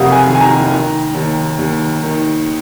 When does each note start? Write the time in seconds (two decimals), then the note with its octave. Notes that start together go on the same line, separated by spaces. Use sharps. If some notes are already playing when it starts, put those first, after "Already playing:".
Already playing: F#1 F2 C3 F5 F#5 D#6
0.12 G#5
0.26 D#3
0.35 G#5
0.41 A#5
0.70 D#3
1.14 D#2
1.59 D#2
2.03 D#3